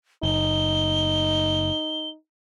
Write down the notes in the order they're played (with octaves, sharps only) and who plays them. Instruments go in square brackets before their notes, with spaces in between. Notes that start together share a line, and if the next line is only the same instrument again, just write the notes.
[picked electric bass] F#1 [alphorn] D#4 [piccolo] G7